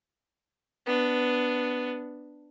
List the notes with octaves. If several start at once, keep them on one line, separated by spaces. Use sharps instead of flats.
B3 D4